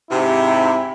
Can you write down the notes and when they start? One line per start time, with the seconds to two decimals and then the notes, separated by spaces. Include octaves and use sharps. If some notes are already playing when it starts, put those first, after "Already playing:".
0.11 G#2 C3 E4